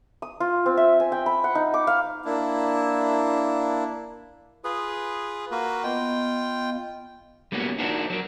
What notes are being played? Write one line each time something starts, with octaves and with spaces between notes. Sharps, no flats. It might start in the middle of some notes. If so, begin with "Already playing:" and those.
D#6
F4
C4
E5
G#5
G5
B5
F#5
D#4
D6
F5
A#3 D4 E4
F4 G#4 B4 D#6
A#3 F#4 B4 C#6
B3 F4 D#5 G5
G3 A#3 B3 C#4 F#4
D4 D#4 F#4 A#4 C5 F#5
F#3 A#4